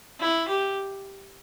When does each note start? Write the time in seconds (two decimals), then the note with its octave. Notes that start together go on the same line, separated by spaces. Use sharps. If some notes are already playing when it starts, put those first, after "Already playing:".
0.20 E4
0.48 G4